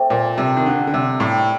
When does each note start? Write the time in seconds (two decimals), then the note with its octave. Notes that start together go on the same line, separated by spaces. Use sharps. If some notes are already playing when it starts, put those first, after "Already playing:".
Already playing: A3 C4 G4 D5
0.10 A#2
0.38 C3 G3 D4 F4
0.57 D#3
0.66 D3
0.87 D3
0.94 C3
1.20 A2 A#3 D4 G4